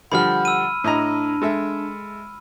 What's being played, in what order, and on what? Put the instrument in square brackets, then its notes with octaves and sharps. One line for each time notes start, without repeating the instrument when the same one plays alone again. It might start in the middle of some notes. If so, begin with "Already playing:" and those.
[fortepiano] D3 F3 G3 [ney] F#5 [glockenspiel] B5 F6
[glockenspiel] E6 D#7
[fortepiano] A2 D#5 A#5 [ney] D4
[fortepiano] G#3 A4 E5